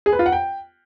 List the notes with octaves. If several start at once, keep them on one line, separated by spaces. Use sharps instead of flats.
G#4
B4
F4
F#5
G5